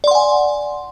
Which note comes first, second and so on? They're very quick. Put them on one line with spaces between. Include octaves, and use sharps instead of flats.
D5 C6 F#5 G#5